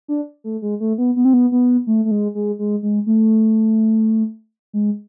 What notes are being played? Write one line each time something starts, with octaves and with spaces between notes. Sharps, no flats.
D4
A3
G#3
A3
B3
B3
C4
B3
B3
A3
A3
G#3
G#3
G#3
G#3
A3
G#3